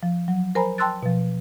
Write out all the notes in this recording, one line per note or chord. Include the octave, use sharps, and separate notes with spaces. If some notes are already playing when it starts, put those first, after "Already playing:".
F3
F#3
A#4 C5 G#5 A#5 B5
G5 A5 C6 E6 F#6 A6
B2 F3